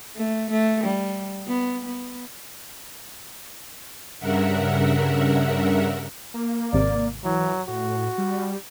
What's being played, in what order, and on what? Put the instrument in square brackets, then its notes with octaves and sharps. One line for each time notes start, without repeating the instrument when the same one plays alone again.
[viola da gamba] A3
A3
G3
B3
B3
[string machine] G2 C#3 A#4 E5 F#5
[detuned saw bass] A#3
[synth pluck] G#1 C3 [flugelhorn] D5
[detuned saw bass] E3 [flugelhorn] F#3
[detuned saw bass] A2 [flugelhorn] F#4
[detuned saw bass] G3